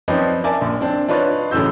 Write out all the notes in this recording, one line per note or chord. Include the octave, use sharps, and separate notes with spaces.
F3 C4 C#4 D#4 B4 D5
A#4 D5 E5 G#5 A5
A#1 A#2
C4 D4
D4 D#4 F4 B4 C#5
A1 A2 C#3 F#3 E6 G6